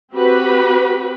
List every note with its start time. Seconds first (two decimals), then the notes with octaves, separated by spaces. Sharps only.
0.14 C4 F#4 G4 B4 B5